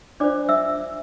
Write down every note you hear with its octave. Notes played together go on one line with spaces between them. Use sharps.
D4 F4 C5 D5 D6
E5 E6